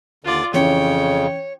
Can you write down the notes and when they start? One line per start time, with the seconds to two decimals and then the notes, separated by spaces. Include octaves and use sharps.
0.24 D#2 D3 F4 D5
0.54 F2 C#3 E3 C#4 C#5 G5